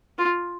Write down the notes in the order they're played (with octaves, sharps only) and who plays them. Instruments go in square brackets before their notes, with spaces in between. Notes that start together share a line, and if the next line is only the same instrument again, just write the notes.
[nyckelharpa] F4